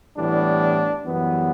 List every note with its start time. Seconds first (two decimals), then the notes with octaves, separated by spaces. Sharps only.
0.17 A2 E3 G3 B3 D4
1.04 F#2 E3 G3 B3